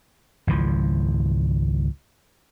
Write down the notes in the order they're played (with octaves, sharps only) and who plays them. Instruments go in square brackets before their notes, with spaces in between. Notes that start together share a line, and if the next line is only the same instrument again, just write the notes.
[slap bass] G#1 C#2 E3 F3